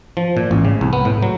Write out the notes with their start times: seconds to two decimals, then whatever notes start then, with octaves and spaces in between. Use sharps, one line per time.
0.17 F3
0.37 A#2
0.51 A1
0.65 C#3
0.81 C2
0.93 B3
1.05 A2
1.23 F#3